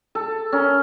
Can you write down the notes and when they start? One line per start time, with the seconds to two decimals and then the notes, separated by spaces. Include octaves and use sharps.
0.15 A4
0.53 C#4 A#4